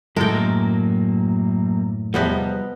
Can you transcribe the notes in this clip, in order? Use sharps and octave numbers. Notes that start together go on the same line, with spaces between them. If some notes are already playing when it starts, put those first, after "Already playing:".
C#2 F#2 A2 G#3 A4 A#4 G5
F#3 A#3
E2 C3 F3 G3 B3 B4 D#5